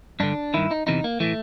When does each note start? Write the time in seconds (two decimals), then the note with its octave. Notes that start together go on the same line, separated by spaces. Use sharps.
0.20 G2 D3 D4
0.54 G2 D#3 E4
0.71 D#4
0.87 E2 C3 E3 D#4
1.04 A#3
1.20 A2 E3 A3